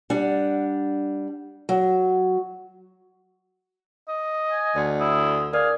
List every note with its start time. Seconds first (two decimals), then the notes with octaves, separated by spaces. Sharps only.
0.10 G3 D4 F#5
1.69 F#3
4.08 D#5
4.51 G#5
4.76 D2 D5
5.00 E4 D#6
5.53 G#4 A#4 D5 F5